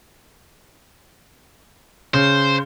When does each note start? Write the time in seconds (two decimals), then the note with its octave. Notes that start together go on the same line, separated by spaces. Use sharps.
2.14 C#3 C5